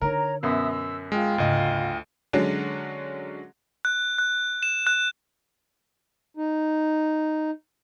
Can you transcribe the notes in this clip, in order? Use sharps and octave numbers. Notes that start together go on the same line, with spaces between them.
D3 D#4 A#4 C#5 A#5
F#2 B2 E5 D#6 E6
E6
G#3 F4 G5 F6
D2 G#2 C#3 D#5
D3 F#3 G#3 C#4 D4
F#6
F#6
E7
F#6
D#4